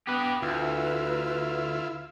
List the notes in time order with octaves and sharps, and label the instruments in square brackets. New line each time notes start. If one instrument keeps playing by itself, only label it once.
[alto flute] B3 [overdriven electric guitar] G4 B4
[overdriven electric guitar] D2 [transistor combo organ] E4 F4 [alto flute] B4